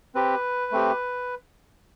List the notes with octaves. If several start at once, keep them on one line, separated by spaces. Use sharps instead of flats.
C4 G4 B4
A3 C4 G4